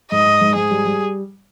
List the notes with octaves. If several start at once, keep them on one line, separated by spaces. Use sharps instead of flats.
G#2 D#5
G#2
G#2
G#2 G#4
G3
G3